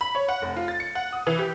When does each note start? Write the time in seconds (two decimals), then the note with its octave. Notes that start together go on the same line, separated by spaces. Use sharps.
0.01 B5
0.15 C#5
0.29 F#5
0.42 F1
0.56 F4
0.68 A6
0.80 C#7
0.95 F#5
1.12 D#6
1.27 E3
1.39 G4